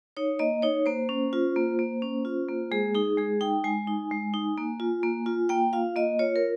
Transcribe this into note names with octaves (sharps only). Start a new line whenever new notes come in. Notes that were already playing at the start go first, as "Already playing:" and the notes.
D#4 C#5
A#3 D#5
D#4 C#5
A#3 C5
C#4
F4
A#3
A#3
C#4
F4
A#3
G#3 G#4
D#4 G#4
G#3 G#4
D#4 G5
G#3 G#5
D#4
G#3
D#4
A#3
F4
A#3
F4
A#3 G5
F4 F5
A#3 D#5
F4 C#5
A#4